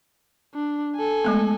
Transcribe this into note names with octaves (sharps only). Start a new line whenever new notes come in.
D4
A4 G#5
G#3 A3 B3